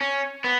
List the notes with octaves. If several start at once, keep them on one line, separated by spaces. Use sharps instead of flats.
C#4
B3